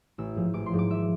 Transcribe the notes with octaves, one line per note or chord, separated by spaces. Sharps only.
A1 E6
G#2 F3
A1 D6
C6
G#2 F3
D6
G#1 E5